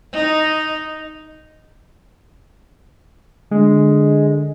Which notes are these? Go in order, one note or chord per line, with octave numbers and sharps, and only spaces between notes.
D#4
D3 G#3